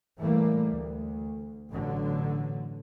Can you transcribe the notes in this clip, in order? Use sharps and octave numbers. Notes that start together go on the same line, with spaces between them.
A2 E3 G3 A3 A#3
D2
A1 B2 D3 F#3